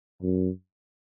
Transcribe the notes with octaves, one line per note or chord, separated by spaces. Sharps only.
F#2